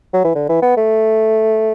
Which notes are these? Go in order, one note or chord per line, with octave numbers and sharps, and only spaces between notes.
F#3
E3
D3
E3
B3
A3